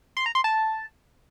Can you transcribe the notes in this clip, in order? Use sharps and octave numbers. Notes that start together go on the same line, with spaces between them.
C6
A#5
C6
A5